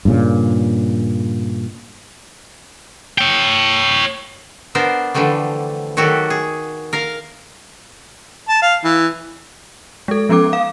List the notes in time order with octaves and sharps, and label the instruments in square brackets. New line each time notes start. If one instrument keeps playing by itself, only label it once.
[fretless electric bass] G2 A#2 C#3
[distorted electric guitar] C#5 G5
[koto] B3 D4 A#4 C5
D3 E3 F3 G3 A3
D#3 F#3 F#4 G4 A4
G#4
A#4 F5 A#5
[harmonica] A5
F5
E3
[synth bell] G#3 A4
F3 B3 C#4 A4 D6
F5